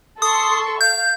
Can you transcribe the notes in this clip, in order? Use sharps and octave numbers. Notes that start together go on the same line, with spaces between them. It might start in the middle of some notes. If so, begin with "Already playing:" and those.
A4 C6 C#6 D#6
F5 G6